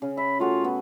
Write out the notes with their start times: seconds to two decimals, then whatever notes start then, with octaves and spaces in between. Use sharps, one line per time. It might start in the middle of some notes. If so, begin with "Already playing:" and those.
0.02 C#3 C#4
0.17 E5 B5
0.40 A3 F4 F#4 G#4
0.64 B3